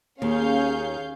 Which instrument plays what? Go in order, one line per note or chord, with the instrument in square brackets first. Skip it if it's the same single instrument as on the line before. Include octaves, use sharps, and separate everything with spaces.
[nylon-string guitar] D#2 [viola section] C#4 G#4 [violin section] C#5 F5 G6